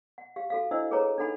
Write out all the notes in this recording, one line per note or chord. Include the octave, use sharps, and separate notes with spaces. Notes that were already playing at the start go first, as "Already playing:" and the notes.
F#5
G4 F5
F#4 A4 F5
D4 E4 C5 D#5 F#5 E6
G#4 A4 B4 C#5 A#5
D4 D#4 A4 F#5 B5